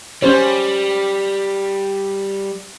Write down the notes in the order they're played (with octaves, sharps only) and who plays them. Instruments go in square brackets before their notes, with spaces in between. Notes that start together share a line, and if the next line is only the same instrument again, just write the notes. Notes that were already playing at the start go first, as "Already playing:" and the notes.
[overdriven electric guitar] G3 [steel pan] C#4 C5 C#5